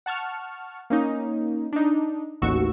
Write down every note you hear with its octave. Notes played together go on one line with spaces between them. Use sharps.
F#5 A5 C#6 F6
A#3 C#4 D#4
D4 D#4
A1 D#2 D#3 F#4 C#6 E6